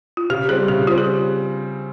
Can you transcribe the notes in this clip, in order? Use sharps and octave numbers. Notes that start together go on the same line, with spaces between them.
F4
C#3 G4
G3 C4 G#4
C#3 G4
G3 C4 F4
G#4